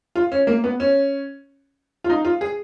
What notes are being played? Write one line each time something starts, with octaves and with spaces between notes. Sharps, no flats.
F4
C#4
A#3
B3
C#4
F4
D#4
F4
G#4